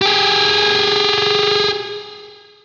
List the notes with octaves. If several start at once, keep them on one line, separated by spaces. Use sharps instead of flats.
G4 G#4